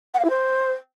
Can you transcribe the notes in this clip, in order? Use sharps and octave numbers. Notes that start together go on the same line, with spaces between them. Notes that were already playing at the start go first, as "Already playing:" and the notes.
F#5
F5
E4
C5